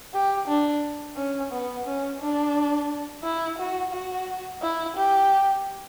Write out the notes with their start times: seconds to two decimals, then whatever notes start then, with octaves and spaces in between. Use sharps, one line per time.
0.14 G4
0.48 D4
1.16 C#4
1.52 B3
1.86 C#4
2.20 D4
3.24 E4
3.58 F#4
3.93 F#4
4.62 E4
4.96 G4